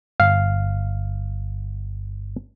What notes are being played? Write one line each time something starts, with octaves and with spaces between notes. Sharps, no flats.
G1 F5